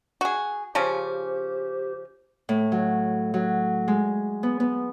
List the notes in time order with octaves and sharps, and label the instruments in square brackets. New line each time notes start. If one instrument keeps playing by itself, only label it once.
[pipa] F#4 G#4
[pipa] C#3 F3 C#4 [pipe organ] G4 C5
[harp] A2
F#3
F#3
G#3
B3
B3